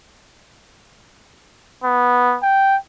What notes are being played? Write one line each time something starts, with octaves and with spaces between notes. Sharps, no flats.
B3
G5